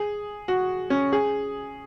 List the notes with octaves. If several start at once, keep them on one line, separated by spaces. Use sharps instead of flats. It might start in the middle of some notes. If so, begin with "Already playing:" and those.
Already playing: G#4
F#4
C#4
G#4